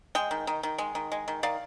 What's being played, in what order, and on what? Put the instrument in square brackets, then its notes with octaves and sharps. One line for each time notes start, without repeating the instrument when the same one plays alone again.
[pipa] G#3 D#5 G5
D#3
D#3
D#3
G#3
D#3
G#3
D#3
D#3 D5 F5